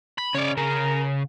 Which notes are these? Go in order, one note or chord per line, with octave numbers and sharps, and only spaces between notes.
B5
C#3 C#4 C#5 D5
C#3 A#4